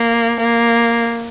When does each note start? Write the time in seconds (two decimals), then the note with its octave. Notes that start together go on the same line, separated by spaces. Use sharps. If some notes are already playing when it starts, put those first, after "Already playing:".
Already playing: A#3
0.40 A#3